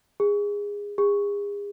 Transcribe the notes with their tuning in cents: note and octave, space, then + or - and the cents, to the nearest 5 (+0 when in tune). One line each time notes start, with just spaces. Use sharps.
G#4 -20
G#4 -40